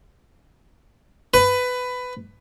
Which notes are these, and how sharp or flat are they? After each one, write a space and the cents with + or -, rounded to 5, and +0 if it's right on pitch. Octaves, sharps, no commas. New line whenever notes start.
B4 +15